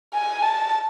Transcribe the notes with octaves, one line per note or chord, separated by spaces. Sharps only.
G#5
A5